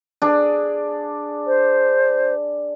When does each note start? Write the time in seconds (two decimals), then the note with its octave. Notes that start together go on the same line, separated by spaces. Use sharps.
0.22 D4 G#4
1.47 C5